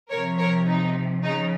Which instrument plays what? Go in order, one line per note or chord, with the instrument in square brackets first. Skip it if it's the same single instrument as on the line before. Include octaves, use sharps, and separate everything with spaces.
[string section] C3 F3 A#4 C#5
A#4 C#5
D#4
C#3 F3 D#4